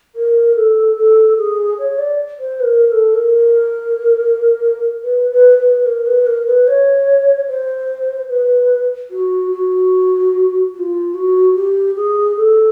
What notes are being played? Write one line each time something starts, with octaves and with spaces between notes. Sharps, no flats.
A#4
A4
A4
G#4
C#5
D5
C5
B4
A#4
A#4
A4
A#4
B4
B4
B4
A#4
B4
A#4
B4
C#5
C5
B4
F#4
F#4
F#4
F4
F#4
G4
G#4
A4